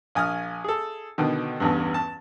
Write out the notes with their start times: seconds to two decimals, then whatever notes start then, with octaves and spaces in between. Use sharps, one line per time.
0.15 A#1 G#5 D#6 F6
0.64 G#4 A4
1.18 B2 D3 D#3
1.60 A1 E2 G2
1.94 A5